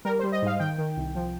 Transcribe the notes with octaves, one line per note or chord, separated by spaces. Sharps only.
G3 A#4
G3 C5
D#5
G#2 F5
D#3 G5
D#3
C2
F3